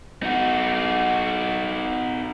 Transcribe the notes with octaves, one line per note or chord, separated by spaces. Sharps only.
D#4 F#4